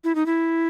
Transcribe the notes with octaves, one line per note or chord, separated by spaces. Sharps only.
E4
D#4
E4